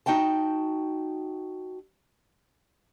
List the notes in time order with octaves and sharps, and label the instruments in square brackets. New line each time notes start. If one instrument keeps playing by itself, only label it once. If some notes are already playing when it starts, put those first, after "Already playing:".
[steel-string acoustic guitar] D#4 F#4 G5 A5